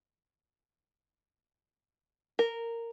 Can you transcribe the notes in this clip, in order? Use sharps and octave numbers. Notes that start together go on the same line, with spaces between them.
A#4